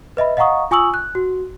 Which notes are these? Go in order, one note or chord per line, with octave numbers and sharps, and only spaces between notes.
B4 D#5 E5 B5
D#5 F5 F#5 A#5 C#6 D#6
F4 G#5 C#6 D#6 E6 F#7
F#6
F#4